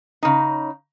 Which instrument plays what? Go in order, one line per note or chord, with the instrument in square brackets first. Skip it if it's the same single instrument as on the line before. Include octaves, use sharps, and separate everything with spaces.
[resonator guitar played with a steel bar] C#3 D#4